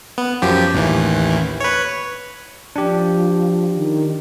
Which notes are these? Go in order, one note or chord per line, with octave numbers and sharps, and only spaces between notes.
B3
F#2 F3 G4
A1 D#2 E3
B4 C#5
F3 D4 G4
D#3